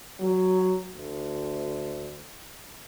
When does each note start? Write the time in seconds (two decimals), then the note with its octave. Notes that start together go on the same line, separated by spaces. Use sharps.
0.20 F#3
0.96 D2